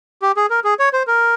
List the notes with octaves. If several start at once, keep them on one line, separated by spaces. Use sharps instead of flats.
G4
G#4
A#4
G#4
C#5
C5
A#4